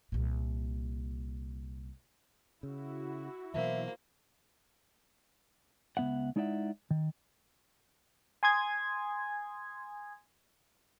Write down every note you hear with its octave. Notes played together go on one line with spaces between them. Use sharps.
C2 A#2
C#3 E4 F#4
B2 E3 F#3 A#3 C5 E5
C#2 D#3 B3 E5 F#5
G#3 D#4 E4 D5 E5 F#5
D#3
G#5 C6 D#6 G#6